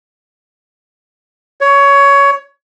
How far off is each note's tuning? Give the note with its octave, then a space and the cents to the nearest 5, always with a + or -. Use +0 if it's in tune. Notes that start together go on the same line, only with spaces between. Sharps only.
C#5 +15